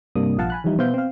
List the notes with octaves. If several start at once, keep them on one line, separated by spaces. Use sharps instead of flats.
G2 C3 G3 A#3 D4 D#6
A#1 F3 F5 F#5 A5
G#5 B5 F#6
E3 F3 G3 D#4 E4
B2 B3 C5 E5 F5 G6
C4 F5